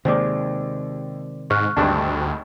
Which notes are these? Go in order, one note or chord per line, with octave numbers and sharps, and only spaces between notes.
D#2 C3 D#3 G#3 C5 D5 D6
G#2 C#6 F6 F#6
G#1 D2 G2 D4